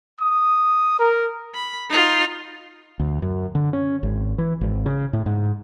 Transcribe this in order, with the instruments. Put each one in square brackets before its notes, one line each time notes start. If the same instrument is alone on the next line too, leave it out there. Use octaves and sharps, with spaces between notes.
[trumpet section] D#6
A#4
[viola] B5
D#4 F4
[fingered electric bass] D2
F#2
D3
C#4
G#1
E3
G#1
C#3
A2
G#2